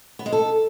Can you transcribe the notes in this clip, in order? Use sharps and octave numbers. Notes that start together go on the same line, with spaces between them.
B3
G#3
A4